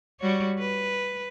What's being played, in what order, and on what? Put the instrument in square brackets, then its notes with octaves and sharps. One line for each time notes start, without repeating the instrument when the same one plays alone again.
[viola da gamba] G3 F#4 C#5
B4